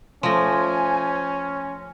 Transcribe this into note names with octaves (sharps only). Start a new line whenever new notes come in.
F3 A3 C#4 C5 G#5 C6 A#6